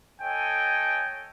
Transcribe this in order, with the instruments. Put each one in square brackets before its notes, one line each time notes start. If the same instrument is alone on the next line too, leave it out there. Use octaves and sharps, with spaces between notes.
[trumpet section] A4 C#5 D#5 G5 G#5